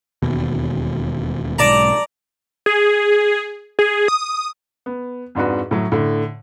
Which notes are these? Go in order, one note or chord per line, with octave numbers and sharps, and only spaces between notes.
E1 D#2 B2
B1 G#2 D5 A5 A#5
G#4
G#4
D#6
B3
F2 G#2 D4 F#4 B4
A2 F#3
A2 D3